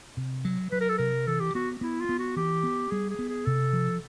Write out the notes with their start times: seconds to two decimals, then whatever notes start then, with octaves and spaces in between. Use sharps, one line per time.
0.17 C3
0.45 F#3
0.72 F#3 B4
0.81 A#4
0.89 A4
0.98 C3 A#4
1.27 E3 A4
1.40 G4
1.55 B3 F#4
1.81 B3 E4
2.01 F4
2.09 B3
2.19 F#4
2.36 E3 G4
2.63 B3
2.91 G3 G#4
3.10 G#4
3.19 B3
3.28 G#4
3.46 C3 A4
3.73 F3